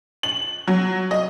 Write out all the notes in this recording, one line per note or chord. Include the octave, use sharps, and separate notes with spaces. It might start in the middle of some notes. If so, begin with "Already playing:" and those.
F#7
F#3
D#5